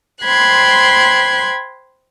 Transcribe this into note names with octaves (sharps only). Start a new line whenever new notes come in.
C5 G5 B5 C6 F#6 G#6